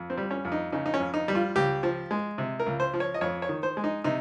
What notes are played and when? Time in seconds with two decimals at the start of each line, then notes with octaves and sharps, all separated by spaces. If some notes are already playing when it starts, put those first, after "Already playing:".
Already playing: F2
0.10 C4
0.17 G3
0.31 C#4
0.45 F2
0.52 D#4
0.72 C#3 D#4
0.86 D#4
0.94 C#4
1.00 F2
1.14 D#4
1.28 G3
1.35 F4
1.55 C#2 G4
1.83 F3
2.11 G#3
2.38 C3
2.60 A#4
2.66 C#2
2.80 C5
2.94 F3
3.00 C#5
3.14 D#5
3.21 F2 C#5
3.42 C#5
3.49 D#3
3.63 C5
3.77 G#3
3.84 D#4
4.04 C3 D#4